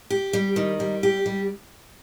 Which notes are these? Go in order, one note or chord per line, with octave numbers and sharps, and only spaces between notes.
G4
G3
D#3
G3
G4
G3